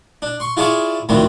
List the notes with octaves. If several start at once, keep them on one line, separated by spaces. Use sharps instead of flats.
D4
C6 C#6
E4 F4 G#4 D5 A5 C#6
D2 A2 D#3 F3 C4 D4